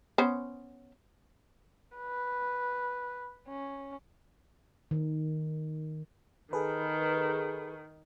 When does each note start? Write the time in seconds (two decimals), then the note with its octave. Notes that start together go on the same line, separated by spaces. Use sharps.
0.18 B3 C#4 C5
1.97 B4
3.48 C#4
4.91 D#3
6.53 D#3 G#4 A4 B4